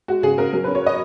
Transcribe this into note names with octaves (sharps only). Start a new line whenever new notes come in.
G#3 F#4
C#3 G#4
C#3 A#4
F#3 A#4
B4
C#4
C#5
D#5